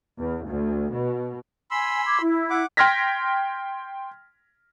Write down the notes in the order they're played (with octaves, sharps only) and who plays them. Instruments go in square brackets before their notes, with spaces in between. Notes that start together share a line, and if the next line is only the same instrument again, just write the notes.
[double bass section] E2
D2
B2
[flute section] G#5 [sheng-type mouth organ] B5 C6 E6
[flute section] D6 G#6
E4
[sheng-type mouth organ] F#5 D6
[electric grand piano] G5 C6 F6 G#6 A#6 B6